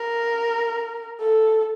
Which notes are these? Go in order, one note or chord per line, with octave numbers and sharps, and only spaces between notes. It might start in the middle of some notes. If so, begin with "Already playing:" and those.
Already playing: A#4
A4